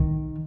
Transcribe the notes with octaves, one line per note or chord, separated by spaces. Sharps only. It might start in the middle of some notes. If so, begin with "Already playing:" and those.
Already playing: D#3